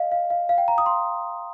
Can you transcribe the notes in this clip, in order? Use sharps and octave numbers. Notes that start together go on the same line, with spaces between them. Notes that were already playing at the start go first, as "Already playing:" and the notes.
Already playing: D#5 F5
F5
F5
F5
G5
A#5
D#6
C6